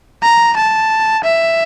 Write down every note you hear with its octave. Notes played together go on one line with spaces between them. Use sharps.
A#5
A5
E5